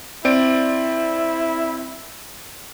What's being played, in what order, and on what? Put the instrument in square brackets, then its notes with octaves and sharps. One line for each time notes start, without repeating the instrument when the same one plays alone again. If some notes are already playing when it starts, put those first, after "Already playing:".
[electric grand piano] C4 D5 D7 [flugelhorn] E4